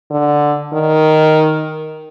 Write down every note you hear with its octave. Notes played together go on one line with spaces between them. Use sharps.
D3
D#3